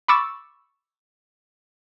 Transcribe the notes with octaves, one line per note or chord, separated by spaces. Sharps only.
B5 C#6 D6 E6 A6